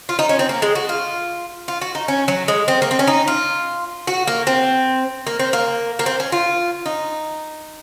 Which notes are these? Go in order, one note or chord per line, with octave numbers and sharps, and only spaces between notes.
F4
D#4
C#4
C4
A#3
G#3
F#4
F4
F4
F#4
D#4
C#4
F#3
G#3
C4
A#3
C4
C#4
D#4
F4
F#4
A#3
C4
A#3
C4
A#3
A#3
C4
C#4
F4
D#4